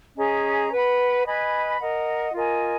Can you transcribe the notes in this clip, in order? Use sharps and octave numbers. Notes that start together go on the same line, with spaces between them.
C#4 G#4 D#5 A#5
B4 F#5 B5
B4 D#5 G#5 B5
A#4 D#5 F#5
F4 A#4 D#5 G#5